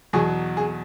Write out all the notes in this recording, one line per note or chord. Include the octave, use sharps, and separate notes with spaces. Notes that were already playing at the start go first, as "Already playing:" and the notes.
E2 B2 F#3 G#4
G#4